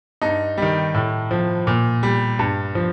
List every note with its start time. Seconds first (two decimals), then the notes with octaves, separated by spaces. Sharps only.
0.22 G2 D#4
0.58 D#3 G3
0.94 A2
1.31 F3
1.67 A#2
2.03 G3
2.39 G2
2.75 F3